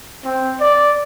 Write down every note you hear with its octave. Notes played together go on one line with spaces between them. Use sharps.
C4
D5